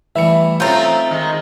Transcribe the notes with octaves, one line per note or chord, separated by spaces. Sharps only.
E3 G3 A3 E5 C#7
A3 C4 C#4 D#4 F4 A#5
D#3 G#3